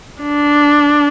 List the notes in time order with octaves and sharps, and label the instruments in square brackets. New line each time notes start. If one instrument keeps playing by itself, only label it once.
[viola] D4